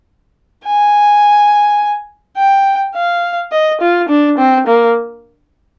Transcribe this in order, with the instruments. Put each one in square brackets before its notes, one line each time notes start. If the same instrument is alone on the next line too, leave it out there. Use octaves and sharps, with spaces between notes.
[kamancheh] G#5
G5
F5
D#5
F4
D4
C4
A#3